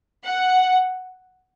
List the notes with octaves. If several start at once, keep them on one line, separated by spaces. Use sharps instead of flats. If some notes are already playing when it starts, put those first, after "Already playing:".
F#5